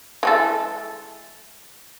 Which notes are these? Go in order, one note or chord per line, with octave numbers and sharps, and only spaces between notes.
E3 G#3 A4